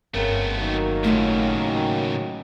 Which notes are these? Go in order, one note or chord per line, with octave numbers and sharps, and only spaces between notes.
G1 C#3 A3 B3 C4 A#4
D#3 F#3 A#3
A2 C#3 A3 F4 E5